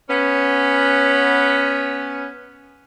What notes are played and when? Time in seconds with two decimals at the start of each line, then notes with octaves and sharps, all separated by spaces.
0.09 B3 C#4